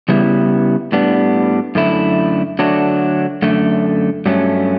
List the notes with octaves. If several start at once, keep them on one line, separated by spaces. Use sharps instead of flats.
C#3 G3 B3 E4
A2 G3 B3 D4
F#2 D3 A3 E4
D3 F#3 A3 D4
F#2 D3 A3
G2 F#3 A3 C#4